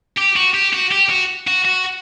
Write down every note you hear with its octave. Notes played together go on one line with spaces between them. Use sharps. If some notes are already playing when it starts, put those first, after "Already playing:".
G4
F#4
G4
F#4
G4
F#4
F#4
F#4